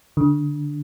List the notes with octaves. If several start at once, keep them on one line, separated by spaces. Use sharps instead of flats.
D3